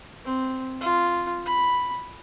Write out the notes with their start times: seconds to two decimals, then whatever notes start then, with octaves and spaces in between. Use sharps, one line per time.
0.25 C4
0.81 F4
1.46 B5